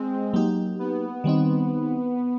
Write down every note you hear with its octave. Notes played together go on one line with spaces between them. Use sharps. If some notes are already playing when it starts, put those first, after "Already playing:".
Already playing: G#3 C4
F#3 A#3 D#4 G4
B3
D#3 G3 C4 D#4